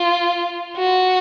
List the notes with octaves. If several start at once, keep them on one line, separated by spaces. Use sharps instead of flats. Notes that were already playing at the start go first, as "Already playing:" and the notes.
Already playing: F4
F#4